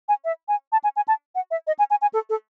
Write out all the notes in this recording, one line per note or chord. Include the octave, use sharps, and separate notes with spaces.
G#5
E5
G#5
A5
G#5
G#5
A5
F#5
E5
D#5
G#5
G#5
G#5
A4
A4